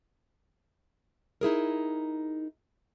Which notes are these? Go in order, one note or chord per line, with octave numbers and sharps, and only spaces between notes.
D#4 E4 G#4 A#4